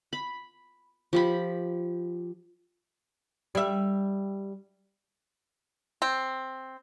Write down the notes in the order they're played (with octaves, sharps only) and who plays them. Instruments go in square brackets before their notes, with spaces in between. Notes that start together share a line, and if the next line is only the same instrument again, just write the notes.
[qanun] B5
F3 G4 B5
[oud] G3 E5
[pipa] C4